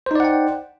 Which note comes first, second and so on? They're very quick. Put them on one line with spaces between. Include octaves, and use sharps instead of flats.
C5 D#4 D5 F#5 G5